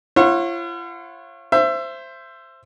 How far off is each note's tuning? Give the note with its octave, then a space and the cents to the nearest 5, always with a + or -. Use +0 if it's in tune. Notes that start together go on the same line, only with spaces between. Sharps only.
F4 -45 C#5 -35 F#5 -20
C5 +0 E5 +25